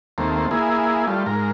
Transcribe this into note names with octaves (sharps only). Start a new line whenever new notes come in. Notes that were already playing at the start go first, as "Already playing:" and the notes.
D#2 A3 A#3 C4
A#3 E4 G#4
G3 A3 F4
G#2 A#4